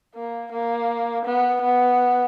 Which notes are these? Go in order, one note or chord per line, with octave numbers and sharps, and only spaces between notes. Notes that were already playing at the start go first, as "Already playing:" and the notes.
A#3
A#3
B3
B3